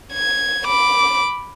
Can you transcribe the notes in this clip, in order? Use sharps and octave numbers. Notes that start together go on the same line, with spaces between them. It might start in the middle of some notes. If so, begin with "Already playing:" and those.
G#6
B5 D6